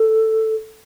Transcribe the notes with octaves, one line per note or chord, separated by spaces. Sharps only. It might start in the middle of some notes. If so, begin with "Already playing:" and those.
Already playing: A4